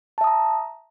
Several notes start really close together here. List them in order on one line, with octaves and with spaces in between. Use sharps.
A5 E5 D#6 A#5